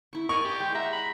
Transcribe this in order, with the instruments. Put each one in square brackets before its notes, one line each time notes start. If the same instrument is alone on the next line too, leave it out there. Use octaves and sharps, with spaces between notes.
[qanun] E4 C#6
[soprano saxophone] A#4 [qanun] D5 G#5 [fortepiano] C#6
[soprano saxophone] G4
[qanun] G#3 [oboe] G5
[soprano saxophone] E5 [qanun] F#5 [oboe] A#5
[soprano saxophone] B5